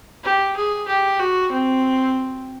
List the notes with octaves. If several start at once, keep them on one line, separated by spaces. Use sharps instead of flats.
G4
G#4
G4
F#4
C4